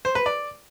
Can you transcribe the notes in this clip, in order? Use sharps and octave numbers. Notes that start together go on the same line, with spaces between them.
C5
B4
D5